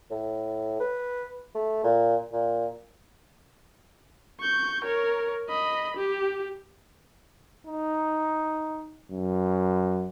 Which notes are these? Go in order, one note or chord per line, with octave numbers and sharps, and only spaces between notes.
A2
B4
A3
A#2
A#2
C#6 G6
A#4 C#5
D#5 B5
G4
D#4
F#2